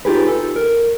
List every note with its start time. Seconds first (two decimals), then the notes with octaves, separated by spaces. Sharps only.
0.05 D#4 F4 G4 G#4 B4
0.28 A4
0.56 A#4